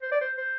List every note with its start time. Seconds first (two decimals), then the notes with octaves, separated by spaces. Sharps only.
0.02 C5
0.12 D5
0.21 C5
0.37 C5